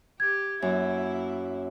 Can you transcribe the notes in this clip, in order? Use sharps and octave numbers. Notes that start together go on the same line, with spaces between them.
G4 G#6
F#2 A#3 E4